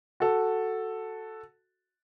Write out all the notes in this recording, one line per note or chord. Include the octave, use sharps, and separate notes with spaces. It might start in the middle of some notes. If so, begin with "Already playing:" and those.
F#4 A4